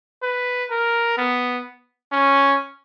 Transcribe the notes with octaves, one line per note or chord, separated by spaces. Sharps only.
B4
A#4
B3
C#4